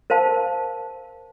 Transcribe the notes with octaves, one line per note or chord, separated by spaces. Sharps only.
A#4 C5 F5 A5